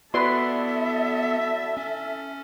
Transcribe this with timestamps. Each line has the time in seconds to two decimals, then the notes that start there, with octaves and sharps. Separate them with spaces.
0.14 B3 E4 F#4 A4 B4 D5 E5 C6
1.77 C#4